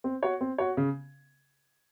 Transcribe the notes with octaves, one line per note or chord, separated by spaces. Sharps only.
C4
F#4 C#5
C4
F#4 C#5
C#3